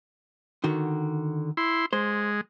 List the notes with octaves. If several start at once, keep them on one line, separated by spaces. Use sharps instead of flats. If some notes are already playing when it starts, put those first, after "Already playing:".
D3 D#3 F#4
E4 C6
G#3 C5